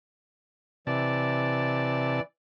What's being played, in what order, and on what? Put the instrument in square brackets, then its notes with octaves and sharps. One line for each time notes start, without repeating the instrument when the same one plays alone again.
[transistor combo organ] C3 A5 [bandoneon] E3 D5